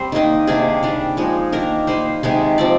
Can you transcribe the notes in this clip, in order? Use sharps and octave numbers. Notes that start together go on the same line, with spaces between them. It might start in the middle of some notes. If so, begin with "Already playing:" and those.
Already playing: G3 C4 C5
D#3 A#3 D#4
C3 D#3 A#3 D4 G#4
D#3 G3 D4
F3 G#3 D#4
D#3 A#3 D4 A#4
G3 A#3 D#4 C5
C3 D#3 G#3 D#4
F3 C4 D#4 D5